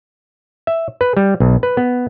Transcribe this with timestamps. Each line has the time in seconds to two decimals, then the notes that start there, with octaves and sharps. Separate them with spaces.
0.67 E5
1.01 B4
1.17 G3
1.40 B1
1.63 B4
1.77 B3